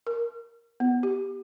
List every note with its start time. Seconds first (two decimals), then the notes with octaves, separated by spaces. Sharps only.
0.07 A#4
0.80 B3
1.03 G4